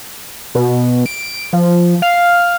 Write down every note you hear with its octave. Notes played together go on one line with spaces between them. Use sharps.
B2
D7
F3
F5